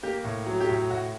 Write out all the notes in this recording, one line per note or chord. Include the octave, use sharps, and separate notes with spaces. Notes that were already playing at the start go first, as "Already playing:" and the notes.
A#3 G4
A2
F#3
G4
A2
A2 F#4